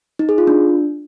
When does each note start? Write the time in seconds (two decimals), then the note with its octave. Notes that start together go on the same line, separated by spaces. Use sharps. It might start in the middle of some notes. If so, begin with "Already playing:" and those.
0.19 D#4
0.29 G#4
0.38 F4
0.47 D4